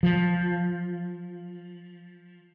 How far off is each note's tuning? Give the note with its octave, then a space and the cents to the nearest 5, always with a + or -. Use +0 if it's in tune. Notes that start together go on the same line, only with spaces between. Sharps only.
F3 +10